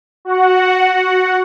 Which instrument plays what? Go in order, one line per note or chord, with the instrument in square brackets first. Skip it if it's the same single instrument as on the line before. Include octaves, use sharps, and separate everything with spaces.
[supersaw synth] F#4 F#5